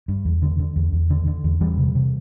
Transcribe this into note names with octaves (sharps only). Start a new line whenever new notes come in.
G2
E2
D3
D3
E2
E2
D3
D3
E2
E2 E3 G3
C3
C3